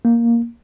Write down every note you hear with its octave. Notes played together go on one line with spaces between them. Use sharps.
A#3